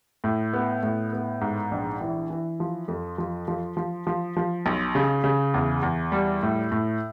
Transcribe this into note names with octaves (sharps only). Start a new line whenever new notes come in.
A2
B3
A2
B3
G#2
A#1
E3
E3
F3
F2
F3
F3
F3
F3
F3
B1
C#3
C#3
E2
E2
G3
A2
A2